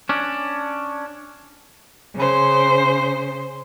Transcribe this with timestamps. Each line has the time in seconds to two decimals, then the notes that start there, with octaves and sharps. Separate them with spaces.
0.09 C#4 D4
2.16 C#3 C5